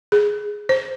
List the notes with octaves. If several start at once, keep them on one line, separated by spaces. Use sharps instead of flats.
G#4
C5